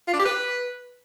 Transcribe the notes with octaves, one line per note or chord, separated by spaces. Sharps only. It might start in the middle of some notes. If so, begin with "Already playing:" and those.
F4
D4
G4
B4